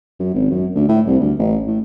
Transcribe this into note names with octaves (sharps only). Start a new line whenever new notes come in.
F#2
G#1
F#2
D2
A2
C2
D2
A1
A2